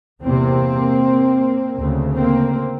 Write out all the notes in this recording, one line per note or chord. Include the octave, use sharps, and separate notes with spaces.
E2 C3 A#3 C4
D2 C#3
A#3 C4